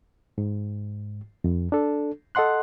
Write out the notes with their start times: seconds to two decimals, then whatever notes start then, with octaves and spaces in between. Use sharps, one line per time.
0.38 G#2
1.44 F2
1.72 D4 A4
2.35 A4 D#5 F#5 C6 F#6